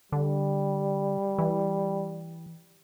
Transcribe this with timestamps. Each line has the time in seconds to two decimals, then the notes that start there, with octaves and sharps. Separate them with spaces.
0.12 D3 G3
1.38 E3